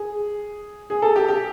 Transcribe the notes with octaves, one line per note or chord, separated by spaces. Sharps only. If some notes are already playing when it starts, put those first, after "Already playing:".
Already playing: G#4
G#4
A4
G4
G4